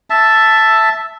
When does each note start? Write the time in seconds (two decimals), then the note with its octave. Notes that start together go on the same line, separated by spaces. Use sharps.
0.10 E5 A5